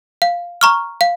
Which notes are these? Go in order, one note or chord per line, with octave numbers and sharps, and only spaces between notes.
F5
A#5 C#6 F6
F5